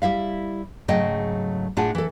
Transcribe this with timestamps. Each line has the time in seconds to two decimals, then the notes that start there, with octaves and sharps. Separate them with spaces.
0.02 G3 E4 E5 F5
0.88 G#2 C#3 F#3 A3 D#5 G5
1.77 A2 D4 F4 G#4 F#5 A5
1.95 E3 A4